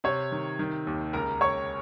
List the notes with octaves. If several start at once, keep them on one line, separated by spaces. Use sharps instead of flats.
C3 C#5
D#3
D#3
D#2
C#2 A#4 A#5
C#2 C#5 C#6